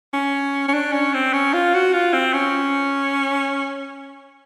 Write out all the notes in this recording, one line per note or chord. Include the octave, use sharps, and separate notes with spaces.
C#4
C#4
D4
C#4
C4
C#4
F4
F#4
F4
C4
C#4